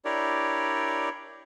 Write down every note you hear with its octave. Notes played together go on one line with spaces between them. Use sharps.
D4 E4 G4 A#4 C#5 D5